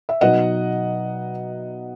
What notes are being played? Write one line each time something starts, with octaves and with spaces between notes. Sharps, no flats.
E5
B2 F#3 B3 D#4 D#5 F#5